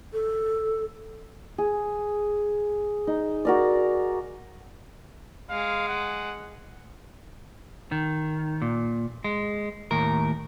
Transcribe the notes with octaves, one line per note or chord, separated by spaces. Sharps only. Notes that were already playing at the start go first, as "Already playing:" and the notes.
A4
G#4
D#4
F#4 A#4 D5
G#3 F5
F#5
D#3
A#2
G#3
D#2 A2 A#4